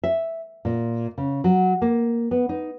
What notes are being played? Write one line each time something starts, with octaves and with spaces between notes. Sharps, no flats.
E5
A#2
C#3
F#3
A#3
B3
D#4